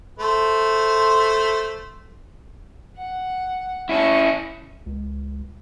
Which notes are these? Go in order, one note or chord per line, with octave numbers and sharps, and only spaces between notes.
A3 C5
F#5
C#4 E4 A5 C#6
C#2